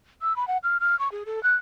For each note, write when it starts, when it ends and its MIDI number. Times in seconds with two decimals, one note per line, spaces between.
0.22 0.36 88
0.36 0.47 83
0.48 0.58 78
0.63 0.78 89
0.80 0.98 89
0.99 1.11 85
1.12 1.24 68
1.26 1.42 69
1.43 1.55 90